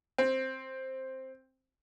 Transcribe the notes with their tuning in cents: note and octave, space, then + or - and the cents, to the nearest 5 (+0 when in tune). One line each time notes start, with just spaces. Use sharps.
C4 +5